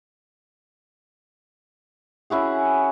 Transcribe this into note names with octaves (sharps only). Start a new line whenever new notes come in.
C#4 E4 F#4 G#4